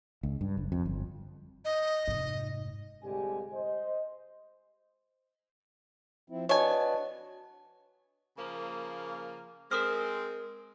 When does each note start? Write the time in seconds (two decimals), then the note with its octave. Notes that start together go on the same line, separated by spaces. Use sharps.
0.23 C#2
0.41 G2
0.57 F#1
0.72 F2
0.85 G1
1.65 D#5
2.08 F1 G#2
3.03 C2 D3 G#3 G4 G#5
3.54 C5 D#5
6.30 F3 C4 E4
6.49 D4 F#4 B4 C#5 D#5 G#5 A5
8.37 C#3 F3 A#3
9.71 G#3 C4 A#4 D#6 F6